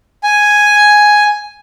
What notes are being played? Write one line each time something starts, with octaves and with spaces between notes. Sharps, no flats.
G#5